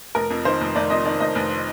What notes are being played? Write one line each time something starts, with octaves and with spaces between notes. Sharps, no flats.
F1 A#4
F2
D#3 C5
F1
F1 D5
F2 D#5
D#3 D5
F1 D#5
F1